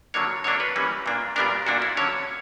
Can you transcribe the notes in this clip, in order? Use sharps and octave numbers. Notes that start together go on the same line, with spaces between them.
D3 F#3 A#3 D4 C#5
D3 F#3 A#3 D4 C#5
B4
E3 G3 A#3 C#4
A#2 A#3 D4
A#2 G3 B3 D4 A#4
A#2 A#3 D4 F#4
E4
D3 F#3 C#4 C#5